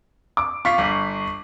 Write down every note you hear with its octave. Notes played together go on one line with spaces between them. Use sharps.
D6
F4 C#6 B6 C7
G1